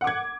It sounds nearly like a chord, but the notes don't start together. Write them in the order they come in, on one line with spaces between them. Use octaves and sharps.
F#5 D6 G#6